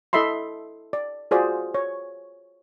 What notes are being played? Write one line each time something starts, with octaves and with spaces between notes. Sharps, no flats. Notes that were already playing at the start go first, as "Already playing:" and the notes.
E4 A4 D#5 E5 B5 C6
D5
F4 F#4 G#4 C5 D5
C#5